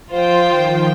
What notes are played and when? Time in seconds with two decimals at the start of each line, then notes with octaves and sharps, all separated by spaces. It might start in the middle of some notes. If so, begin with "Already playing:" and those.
0.11 F3 F4 C5 G5
0.47 D#3